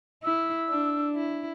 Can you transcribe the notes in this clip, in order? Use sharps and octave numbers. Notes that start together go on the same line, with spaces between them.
E4 E6
D4
E4